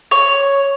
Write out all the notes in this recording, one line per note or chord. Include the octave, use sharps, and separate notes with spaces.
C#5